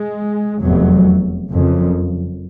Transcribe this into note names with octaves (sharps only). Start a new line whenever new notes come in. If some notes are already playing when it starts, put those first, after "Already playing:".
Already playing: G#3
F1 E2 C3 F#3
F#1 F2 C#3